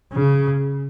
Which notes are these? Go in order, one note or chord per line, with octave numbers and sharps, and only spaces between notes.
C#3